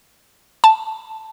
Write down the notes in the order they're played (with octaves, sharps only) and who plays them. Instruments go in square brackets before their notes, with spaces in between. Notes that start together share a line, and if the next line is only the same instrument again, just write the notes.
[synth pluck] A5